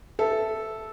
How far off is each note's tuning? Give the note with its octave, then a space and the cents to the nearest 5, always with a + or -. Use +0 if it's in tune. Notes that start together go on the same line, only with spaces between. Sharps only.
A4 -5 E5 +0